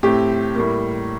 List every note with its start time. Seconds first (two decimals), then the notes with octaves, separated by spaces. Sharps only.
0.03 A2 A3 C4 G4
0.55 A2 G3 A#3